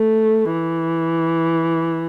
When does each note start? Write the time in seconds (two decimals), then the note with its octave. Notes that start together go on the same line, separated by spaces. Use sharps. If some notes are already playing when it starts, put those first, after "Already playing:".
Already playing: A3
0.52 E3